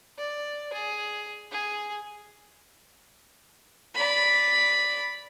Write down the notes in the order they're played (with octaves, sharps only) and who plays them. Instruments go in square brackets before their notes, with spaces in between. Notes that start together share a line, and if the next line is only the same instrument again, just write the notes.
[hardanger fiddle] D5
G#4
G#4
[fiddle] D5 B5